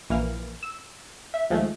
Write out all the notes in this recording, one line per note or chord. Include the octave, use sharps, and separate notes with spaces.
A#1 E3 A#3 F6
E6
E5
D#2 F3 G#3 A3